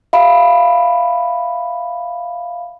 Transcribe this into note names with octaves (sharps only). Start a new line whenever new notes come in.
E5 F5 B5